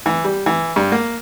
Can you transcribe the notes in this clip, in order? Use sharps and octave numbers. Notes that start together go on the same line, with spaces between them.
E3
G3
E3
G2
A#3